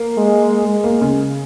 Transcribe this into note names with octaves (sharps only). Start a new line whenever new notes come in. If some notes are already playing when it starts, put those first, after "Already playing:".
Already playing: A#3
G#3
G#3
A#3
C#3